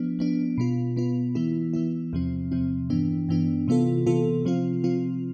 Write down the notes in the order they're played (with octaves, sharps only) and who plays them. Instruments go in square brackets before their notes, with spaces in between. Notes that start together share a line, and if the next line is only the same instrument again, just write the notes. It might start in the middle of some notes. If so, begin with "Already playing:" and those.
Already playing: [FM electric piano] F3 B3 D4
F3 B3 D4
B2 B3 F4
B2 B3 F4
E3 B3 E4
E3 B3 E4
E2 C3 F3 C4
E2 C3 F3 C4
G2 E3 B3 D4
G2 E3 B3 D4
C3 E3 B3 F4 A4
C3 E3 B3 F4 A4
C3 F3 C4 F4
C3 F3 C4 F4